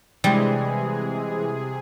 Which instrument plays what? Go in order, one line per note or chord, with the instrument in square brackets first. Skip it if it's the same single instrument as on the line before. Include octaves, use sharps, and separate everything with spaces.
[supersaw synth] C3 G#4 [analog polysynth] E3 G#3 [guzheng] G3